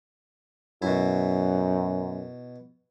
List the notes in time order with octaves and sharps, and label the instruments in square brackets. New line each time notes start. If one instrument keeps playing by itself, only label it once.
[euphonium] F#2 [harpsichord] B2 E4